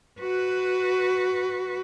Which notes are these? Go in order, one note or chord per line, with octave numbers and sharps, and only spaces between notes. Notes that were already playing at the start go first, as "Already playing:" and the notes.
F#4 B4